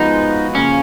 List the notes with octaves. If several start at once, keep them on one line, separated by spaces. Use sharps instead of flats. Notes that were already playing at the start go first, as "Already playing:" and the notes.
Already playing: F3 G#3 B3 D#4 F#4 B4
C#3 F3 A#3 C#4